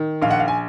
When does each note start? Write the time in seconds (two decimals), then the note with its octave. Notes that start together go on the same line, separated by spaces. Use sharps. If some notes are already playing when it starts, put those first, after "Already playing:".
Already playing: D#3
0.22 A#1 F5
0.31 F#5
0.39 F5
0.48 G#5